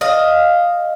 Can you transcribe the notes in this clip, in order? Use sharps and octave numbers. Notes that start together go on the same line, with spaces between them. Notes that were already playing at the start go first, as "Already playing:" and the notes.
D#5 F5